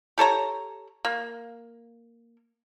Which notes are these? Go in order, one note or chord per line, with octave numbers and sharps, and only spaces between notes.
G4 A4 C#5 A#5
A#3